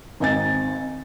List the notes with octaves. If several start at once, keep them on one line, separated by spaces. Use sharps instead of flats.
G#1 C4 D#4 G#5 A6